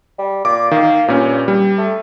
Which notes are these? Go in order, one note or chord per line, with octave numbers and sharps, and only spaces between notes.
G3
A#2 D6
D#3 A#3
G2 A#2 C#4
G3
A3